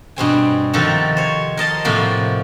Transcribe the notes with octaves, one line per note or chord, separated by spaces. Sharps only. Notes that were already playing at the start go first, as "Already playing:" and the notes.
G2 B2 C4 G#5
C3 D#3 F3 D#4 F#4 A4
C5 C#5
A#4 D#5 A5 C6
A2 C3 F3 A#3 F#4